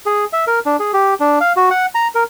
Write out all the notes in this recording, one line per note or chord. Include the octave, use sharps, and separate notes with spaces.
G#4
E5
A#4
D4
G#4
G4
D4
F5
F#4
F#5
A#5
A#4